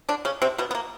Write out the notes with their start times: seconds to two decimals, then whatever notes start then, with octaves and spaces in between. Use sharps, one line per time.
0.09 D3 D4
0.25 C#3 C#4
0.42 C3 C4
0.58 B2 B3
0.71 B3
0.75 A#3